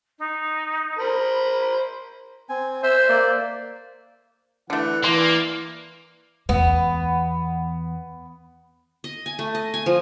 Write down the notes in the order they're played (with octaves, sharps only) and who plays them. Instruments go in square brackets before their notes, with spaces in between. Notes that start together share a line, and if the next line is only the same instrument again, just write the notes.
[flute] D#4
[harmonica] A#4 C5 [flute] B5
[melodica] C4 G#5
[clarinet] C5 [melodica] E5 E6
[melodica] A#3 D5
[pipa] D3 A3 [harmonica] E3 F#5
[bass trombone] E3 [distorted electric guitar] A#3 [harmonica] D5 [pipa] C6
[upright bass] E2 [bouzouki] B3
[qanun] D#5
G#5
A3
D#5
G#5
F3